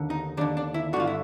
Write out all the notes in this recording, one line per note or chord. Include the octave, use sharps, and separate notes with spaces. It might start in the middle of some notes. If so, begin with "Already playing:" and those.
Already playing: D#2 D3
D#4
D#2 D3 D4
D4
E4
G2 D3 F4 F#4
E4